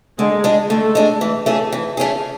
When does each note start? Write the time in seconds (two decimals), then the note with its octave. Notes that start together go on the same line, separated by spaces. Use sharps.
0.19 D3 G#3
0.44 G#3 D4
0.70 D3 A3
0.95 G#3 D4
1.21 E3
1.46 A3 C#4 G#4
1.72 E3
1.97 A3 C#4 G#4